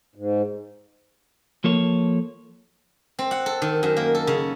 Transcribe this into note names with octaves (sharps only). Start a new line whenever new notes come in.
G#2
F3 A#3 A4 C#5
C4
F#5
A4
D#3
F#2
A#3
A4
C#3